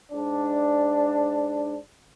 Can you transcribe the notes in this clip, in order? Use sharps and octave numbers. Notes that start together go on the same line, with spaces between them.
G#2 D4